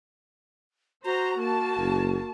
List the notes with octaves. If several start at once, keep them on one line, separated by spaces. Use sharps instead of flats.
F#4 C5 A#5
A#3 A5
F#1